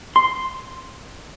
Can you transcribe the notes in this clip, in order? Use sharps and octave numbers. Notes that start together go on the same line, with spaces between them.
C6